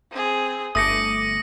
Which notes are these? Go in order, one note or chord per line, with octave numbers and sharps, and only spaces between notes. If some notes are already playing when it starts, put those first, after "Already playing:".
C4 G#4
G1 A3 D6 D#6 A#6 C#7 D#7